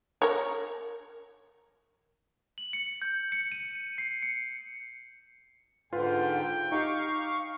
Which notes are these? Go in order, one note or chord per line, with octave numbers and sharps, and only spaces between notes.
A#4 C#5
F#7
C#7
G6
C#7
D#7
C7
C#7
G#2 D3 F4 B4 G5
D#4 G4 F5 C#6